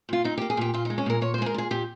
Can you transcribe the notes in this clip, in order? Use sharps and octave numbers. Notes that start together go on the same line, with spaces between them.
A#2 F4
A#2 D#4
G4
A#3
G#4
A#2 G4
A#2 F4
D#4
G#3
C#4
A#2 A#4
A#2 C#5
C5
G#3 G#4
A#4
A#2 G#4
A#2 G4